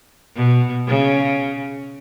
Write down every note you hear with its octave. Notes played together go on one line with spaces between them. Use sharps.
B2
C#3